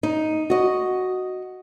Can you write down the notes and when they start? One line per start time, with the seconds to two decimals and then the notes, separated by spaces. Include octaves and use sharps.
0.03 D#4
0.50 F#4 D#5